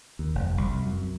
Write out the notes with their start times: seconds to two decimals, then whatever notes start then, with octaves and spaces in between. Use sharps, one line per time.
0.19 D#2
0.35 F1
0.58 C2
0.86 F#2